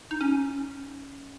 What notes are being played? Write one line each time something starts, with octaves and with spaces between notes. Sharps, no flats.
D#4
C#4